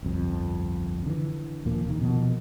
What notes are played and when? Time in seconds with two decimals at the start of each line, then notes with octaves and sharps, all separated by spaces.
0.03 G1 C2 F2
1.06 D3 E3
1.65 D#2 A#2 F3 A#3
1.86 C3 D#3
2.01 B2 F3 A#3